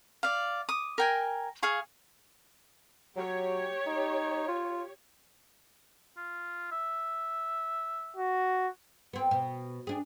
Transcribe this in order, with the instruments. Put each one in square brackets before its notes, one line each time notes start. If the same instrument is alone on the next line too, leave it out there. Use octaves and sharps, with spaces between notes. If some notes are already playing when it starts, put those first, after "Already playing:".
[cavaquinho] D5 F5
D6 D#6
A#4 G5 G#5
G#4 F5 C#6
[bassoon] F#3 [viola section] G4 C#5
[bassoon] D#4
F4
[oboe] F4
E5
[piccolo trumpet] F#4
[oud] B3 C4
B2
D4 G#4